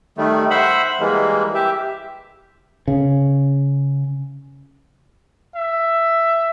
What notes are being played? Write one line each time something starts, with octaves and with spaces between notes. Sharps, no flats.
D#3 G3 A3
C5 E5 F#5 B5
E3 G3 G#3 A#3
G4 E5
C#3
E5